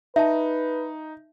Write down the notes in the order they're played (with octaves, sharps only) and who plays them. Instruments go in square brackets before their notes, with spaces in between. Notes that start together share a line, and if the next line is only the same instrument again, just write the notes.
[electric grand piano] D#4 [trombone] B4 [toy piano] E5 A5